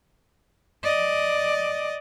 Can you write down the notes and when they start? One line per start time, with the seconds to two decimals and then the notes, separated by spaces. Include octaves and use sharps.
0.83 D5 D#5